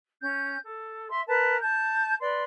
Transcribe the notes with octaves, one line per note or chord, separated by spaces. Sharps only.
C#4 G6
A4
E5 C6
A#4 B4 A5
A5 G6
B4 D5 C6